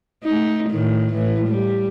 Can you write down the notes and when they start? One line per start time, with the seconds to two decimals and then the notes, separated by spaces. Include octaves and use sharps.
0.24 A3 D#4
0.70 A2 D#3
1.13 A2 E3
1.48 G3